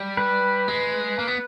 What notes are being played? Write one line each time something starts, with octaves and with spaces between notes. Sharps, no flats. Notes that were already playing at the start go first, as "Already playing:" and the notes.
Already playing: G3
B4
G#3
A#3
B3